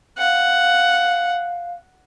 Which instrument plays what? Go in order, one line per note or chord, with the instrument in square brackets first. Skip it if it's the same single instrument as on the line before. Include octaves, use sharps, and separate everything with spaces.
[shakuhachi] F5 [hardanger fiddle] F#5